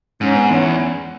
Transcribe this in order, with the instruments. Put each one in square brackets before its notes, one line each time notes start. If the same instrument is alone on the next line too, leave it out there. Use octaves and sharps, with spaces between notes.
[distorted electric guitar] G#2 [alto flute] C#4
[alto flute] B3
[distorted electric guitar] E2 [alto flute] C#4